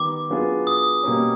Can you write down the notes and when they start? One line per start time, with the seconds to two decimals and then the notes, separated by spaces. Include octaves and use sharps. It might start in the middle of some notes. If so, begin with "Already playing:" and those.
Already playing: D#3 G3 B3 D6
0.30 F#3 B3 D4 F4 G#4
0.67 D#6
1.03 B2 G3 A#3 C#4